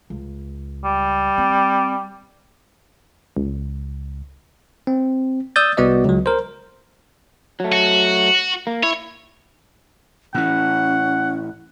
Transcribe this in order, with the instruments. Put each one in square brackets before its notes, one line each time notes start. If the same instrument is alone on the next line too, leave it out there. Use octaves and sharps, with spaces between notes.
[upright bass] C#2
[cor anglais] G3
[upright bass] C4
[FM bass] C#2
[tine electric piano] C4
D5 D#6 E6 G6 A6
C2 B3 F#4 D5 D#5
C#2 F#3
A#4 C5
[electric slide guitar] F#3 A3
[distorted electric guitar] F#4
[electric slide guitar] A#3
[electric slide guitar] E4 [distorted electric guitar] C#5
[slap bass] A2 E3 [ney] C#4 [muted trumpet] F#5